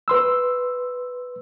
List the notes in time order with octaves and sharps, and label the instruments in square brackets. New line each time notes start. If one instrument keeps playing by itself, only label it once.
[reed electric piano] B4 C6 E6